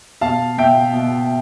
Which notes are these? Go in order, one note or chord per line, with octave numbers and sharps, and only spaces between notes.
B2 F5 A5
B2 E5 G5
B2